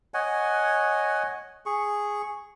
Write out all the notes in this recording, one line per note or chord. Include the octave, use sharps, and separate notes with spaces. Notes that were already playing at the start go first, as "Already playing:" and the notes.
C#5 D#5 F#5 G#5
G#4 C#6